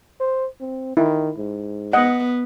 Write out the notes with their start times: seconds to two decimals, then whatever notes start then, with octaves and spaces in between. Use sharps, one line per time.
0.20 C5
0.61 C4
0.97 D#3 E4
1.38 G#2
1.93 B3 D#5 F#5